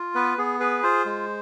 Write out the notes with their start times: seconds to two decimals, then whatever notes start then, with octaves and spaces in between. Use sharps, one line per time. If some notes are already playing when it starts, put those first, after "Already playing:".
Already playing: F4
0.15 B3 B4
0.38 B3 G#4
0.60 G#4 B4
0.83 F4 C5
1.05 G#3